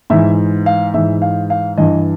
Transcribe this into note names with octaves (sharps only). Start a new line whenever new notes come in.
G#2 E3 E5
F5
G#2 E3 E5
F5
F5
G2 E3 D#5